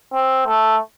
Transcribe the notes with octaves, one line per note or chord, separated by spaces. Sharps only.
C4
A3